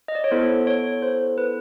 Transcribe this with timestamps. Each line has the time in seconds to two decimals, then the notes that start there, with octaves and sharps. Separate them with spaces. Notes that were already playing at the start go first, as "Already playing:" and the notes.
0.08 D#5
0.15 D5
0.24 C#5
0.31 B3 E4 A4 C5
0.67 C#5
1.02 C5
1.38 B4